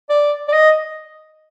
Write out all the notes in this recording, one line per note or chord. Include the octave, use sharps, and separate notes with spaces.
D5
D5
D#5